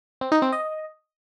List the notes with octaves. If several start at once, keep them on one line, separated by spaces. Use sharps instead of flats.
C4
D#4
C4
D#5